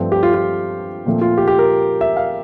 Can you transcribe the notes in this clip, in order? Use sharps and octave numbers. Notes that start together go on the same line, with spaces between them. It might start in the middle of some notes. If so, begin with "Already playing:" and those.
Already playing: G2 F3 A3 C4
G4
F4
F4
A#2 F3 A3 C4
F4
G4
G4
A#4
E5
F5